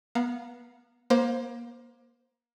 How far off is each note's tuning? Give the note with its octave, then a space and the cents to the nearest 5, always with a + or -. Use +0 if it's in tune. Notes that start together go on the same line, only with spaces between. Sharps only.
B3 -20 F5 +0 A#5 +0
A#3 +30 C5 +0 F5 +0